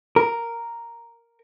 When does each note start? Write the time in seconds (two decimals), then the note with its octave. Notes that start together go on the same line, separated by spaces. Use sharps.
0.16 A#4